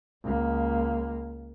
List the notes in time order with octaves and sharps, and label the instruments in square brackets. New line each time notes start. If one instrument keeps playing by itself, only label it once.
[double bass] C#2 A#3